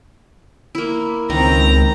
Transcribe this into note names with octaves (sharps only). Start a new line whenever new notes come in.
A#3 E4
C#2 D#3 C4 A#5